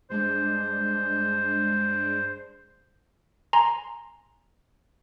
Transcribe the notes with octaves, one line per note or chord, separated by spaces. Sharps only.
G2 G#3 D4 C5
G#5 A#5 C6